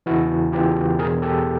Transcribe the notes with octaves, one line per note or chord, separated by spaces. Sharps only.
E2 C#3 E3 E4 F#4
E2 C#3 E3 F4 G4
B2 G#4 A#4
E2
G4 A4